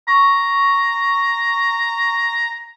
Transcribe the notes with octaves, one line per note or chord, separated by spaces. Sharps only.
A#5 C#6